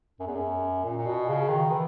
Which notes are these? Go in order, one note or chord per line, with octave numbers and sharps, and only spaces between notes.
F#2
E2
F#2
A#2
A#2
B2
C#3
D#3
E3